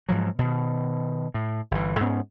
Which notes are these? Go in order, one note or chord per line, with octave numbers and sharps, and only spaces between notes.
G#2 F3 F#3
B2 D#3
A2
G1 E3
G#2 B3 C#4